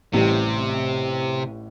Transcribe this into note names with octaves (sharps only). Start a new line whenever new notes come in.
A1 A2 C3 G3